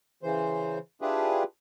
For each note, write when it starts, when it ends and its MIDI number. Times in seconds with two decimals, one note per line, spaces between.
0.23 0.79 49
0.23 0.79 52
0.23 0.79 72
1.01 1.43 62
1.01 1.43 64
1.01 1.43 65
1.01 1.43 67
1.01 1.43 68
1.01 1.43 71